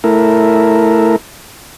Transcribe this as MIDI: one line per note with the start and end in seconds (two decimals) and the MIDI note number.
0.04 1.16 57
0.04 1.16 64
0.04 1.16 70